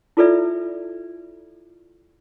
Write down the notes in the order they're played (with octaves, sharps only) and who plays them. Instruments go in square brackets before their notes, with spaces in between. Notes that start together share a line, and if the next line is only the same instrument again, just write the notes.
[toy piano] E4 F4 A4 B4 D5 E5